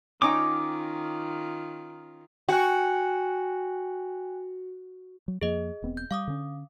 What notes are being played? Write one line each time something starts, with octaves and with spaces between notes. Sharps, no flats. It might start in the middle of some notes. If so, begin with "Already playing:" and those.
D#3 C#4 D#4 F4 G5 D6
F#4 G5 G#5 F#6
F#3
F2 F3 A#3 G#4 D#5
E1 B3 C4
G6
G3 F5 D6 D#6
D3 C#4